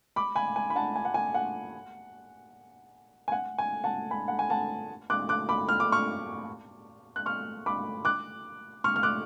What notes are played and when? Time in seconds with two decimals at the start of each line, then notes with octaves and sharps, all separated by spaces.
0.16 B5 D6
0.35 G#5 B5
0.56 G#5
0.70 B5
0.76 F#5 A5
0.96 G#5
1.05 F#5
1.14 G#5
1.34 F#5
3.28 G#5
3.32 F#5
3.58 G#5
3.84 F#5 A5
4.11 G#5 B5
4.28 F#5
4.39 G#5
4.50 F#5 A5
5.10 D6 F#6
5.29 D6 F#6
5.49 B5 D6
5.69 F6
5.80 D6
5.92 C#6 F6
7.16 F#6
7.26 C#6 F6
7.66 B5 D6
8.05 D6 F#6
8.84 C#6 F6
8.96 F6
9.03 D6 F#6